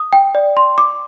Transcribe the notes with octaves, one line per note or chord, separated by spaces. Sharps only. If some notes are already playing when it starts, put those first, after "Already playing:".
Already playing: D#6
G5
D5
C6
D6